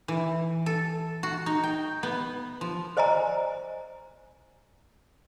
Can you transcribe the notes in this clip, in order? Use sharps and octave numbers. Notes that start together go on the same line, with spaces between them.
E3
A4
F#4
D#4
G5
B3
F3
C5 D5 D#5 G#5 A#5